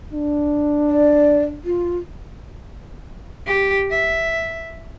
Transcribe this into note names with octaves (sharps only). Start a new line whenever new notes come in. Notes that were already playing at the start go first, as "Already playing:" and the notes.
D4
D5
F4
G4
E5